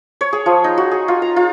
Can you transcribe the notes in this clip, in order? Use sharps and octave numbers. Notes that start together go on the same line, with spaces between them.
C#5
G#4
F3
D#4
F#4
G#4
F4
A#5
F4